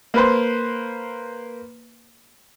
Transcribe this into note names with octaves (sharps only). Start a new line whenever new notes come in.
A#3 B4 C5